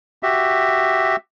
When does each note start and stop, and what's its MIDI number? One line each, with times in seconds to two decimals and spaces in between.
0.23 1.16 66
0.23 1.16 67
0.23 1.16 76